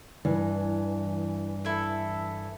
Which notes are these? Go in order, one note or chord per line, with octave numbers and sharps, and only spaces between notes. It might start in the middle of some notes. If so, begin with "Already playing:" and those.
G2 E3
E4 A4